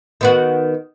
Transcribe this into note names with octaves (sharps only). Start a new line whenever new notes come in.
D#3 B3 F#4